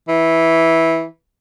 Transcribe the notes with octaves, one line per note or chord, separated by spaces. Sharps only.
E3